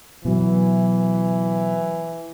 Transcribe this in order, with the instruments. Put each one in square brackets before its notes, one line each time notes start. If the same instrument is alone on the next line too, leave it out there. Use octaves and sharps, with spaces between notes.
[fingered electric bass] B2 F#3 [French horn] E3